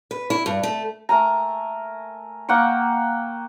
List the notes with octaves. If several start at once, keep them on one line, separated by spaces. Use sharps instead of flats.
B4
E4
G2
A3
A3 A#4 G#5 A#5
A#3 F#5 G5 C#6